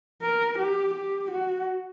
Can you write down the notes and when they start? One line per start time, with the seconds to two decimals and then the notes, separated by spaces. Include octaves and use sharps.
0.22 A#4
0.59 G4
0.95 G4
1.31 F#4